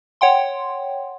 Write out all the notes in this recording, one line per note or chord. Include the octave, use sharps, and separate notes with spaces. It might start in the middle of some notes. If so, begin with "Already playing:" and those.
C#5 F#5 G5 C6